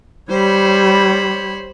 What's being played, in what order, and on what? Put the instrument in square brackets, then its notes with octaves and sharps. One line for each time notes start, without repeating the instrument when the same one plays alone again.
[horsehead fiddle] G3 C#5 [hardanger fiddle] C5 B5